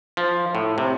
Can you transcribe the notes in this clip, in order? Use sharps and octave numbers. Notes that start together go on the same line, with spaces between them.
F3
A2
C3